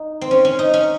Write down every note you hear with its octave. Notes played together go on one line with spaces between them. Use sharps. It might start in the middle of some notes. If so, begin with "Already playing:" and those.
Already playing: D#4
C4
C#4
C#4
D#4
C#4